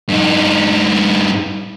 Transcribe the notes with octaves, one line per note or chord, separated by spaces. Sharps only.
G2 D#4